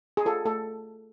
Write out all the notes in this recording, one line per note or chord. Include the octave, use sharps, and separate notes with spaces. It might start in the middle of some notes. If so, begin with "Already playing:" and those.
G#4
F4 A4
A3 A4